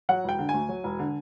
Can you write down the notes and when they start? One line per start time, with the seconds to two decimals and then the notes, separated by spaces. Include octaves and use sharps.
0.09 F#3 F#5
0.24 E1 G5
0.39 D3
0.49 G#5
0.54 D2
0.69 F#3
0.84 E1
0.99 D3